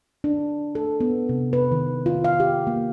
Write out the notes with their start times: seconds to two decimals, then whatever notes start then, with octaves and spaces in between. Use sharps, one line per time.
0.24 D4
0.75 A4
1.00 B3
1.29 C3
1.53 B4
1.72 D#3
2.06 F4
2.24 F5
2.40 G4
2.67 A#3